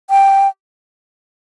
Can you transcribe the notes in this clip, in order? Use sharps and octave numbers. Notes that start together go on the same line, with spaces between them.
G5